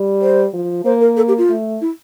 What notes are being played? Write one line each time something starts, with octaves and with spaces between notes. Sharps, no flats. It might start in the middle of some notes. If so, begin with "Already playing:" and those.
Already playing: G3
C5
F3
A#3 C5
A#4
A4
G4
F4
A3
E4